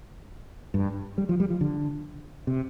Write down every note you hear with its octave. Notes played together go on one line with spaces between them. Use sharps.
G2
G3
F3
G3
F3
D3
C3